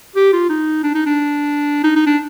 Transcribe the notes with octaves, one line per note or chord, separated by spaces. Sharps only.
G4
F4
D#4
D4
D#4
D4
D#4
D#4
D4